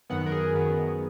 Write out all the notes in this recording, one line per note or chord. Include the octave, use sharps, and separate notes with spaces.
F#2 D#3 F#3 B3 F#5
A#4
G#4
F#2 D#3 F#3 B3